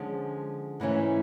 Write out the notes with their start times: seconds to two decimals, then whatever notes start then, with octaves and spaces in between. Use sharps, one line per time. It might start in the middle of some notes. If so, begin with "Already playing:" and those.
Already playing: D3 F3 G#3 C#4
0.80 G#2 E3 A3 C#4 E4